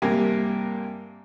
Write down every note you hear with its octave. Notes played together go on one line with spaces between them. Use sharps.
G2 C3 A#3 G4 G#5